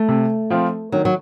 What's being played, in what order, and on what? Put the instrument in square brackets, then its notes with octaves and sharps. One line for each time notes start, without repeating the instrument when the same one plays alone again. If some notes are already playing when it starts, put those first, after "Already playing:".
Already playing: [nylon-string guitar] A3
[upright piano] C3
F3 C4 F4
[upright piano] D#3 [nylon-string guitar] F#3
[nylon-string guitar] F#3